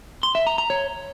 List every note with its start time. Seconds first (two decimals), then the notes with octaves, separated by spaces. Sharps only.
0.23 C6
0.35 E5
0.47 A#5
0.58 A#5
0.70 C#5